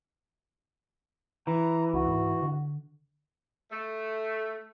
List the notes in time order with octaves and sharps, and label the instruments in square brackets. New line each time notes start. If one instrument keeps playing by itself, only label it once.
[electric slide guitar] E3 [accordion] A#5
[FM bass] C#2 [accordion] F#4
[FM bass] G#2
D3
[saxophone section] A3